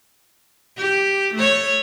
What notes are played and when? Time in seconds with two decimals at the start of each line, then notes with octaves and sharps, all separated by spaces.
0.78 G4
1.35 A3 C#5